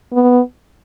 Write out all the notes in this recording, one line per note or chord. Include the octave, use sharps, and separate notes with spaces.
B3